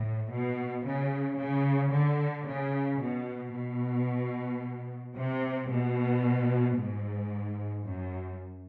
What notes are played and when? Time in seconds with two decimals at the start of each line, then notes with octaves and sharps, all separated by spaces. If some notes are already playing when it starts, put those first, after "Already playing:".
Already playing: A2
0.32 B2
0.86 C#3
1.39 C#3
1.93 D3
2.47 C#3
3.01 B2
3.55 B2
5.16 C3
5.70 B2
6.77 G#2
7.84 F#2